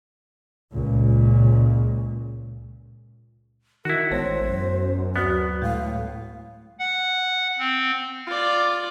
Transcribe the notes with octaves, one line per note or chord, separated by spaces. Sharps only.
C#2 A#2
D#3 E4 F#4 A#4
A1 G#3 B3 C5 C#5
F#2
D2 F#3 B3 F#4 A6
A2 G#3 A3 F5
F#5
C4
F4 D5